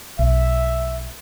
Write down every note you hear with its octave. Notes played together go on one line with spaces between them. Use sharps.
B1 E5